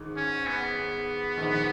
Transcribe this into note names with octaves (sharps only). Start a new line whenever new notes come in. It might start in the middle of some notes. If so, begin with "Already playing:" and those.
Already playing: G#1 G#2 D#3
C#4
B3
A#1 G#2 D#3 G#3